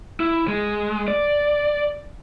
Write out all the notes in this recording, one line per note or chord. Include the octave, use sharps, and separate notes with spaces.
E4
G#3
D5